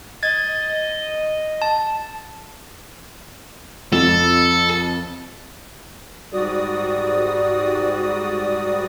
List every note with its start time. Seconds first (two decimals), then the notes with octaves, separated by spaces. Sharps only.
0.23 D#5 G#6 A6
1.62 A5
3.93 F2 A4
6.33 G#2 G3 F#4 D5 D#6